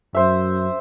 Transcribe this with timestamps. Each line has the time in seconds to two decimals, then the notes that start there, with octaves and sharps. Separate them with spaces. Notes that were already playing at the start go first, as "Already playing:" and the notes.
0.15 F#2 C5 E5